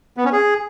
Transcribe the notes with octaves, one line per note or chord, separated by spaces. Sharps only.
B3
C#4
G#4